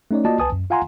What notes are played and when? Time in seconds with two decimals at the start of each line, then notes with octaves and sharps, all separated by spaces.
0.11 A3 C#4 D#4 C#5 D5
0.25 A#3 F4 F#4 D5 D#5 A5
0.40 C2 B4 G#5 A5 D#6
0.52 F#2
0.70 F4 F5 F#5 G#5 A#5 C6